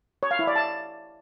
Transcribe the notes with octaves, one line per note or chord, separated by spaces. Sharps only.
C#5
F5
E4
D5
A5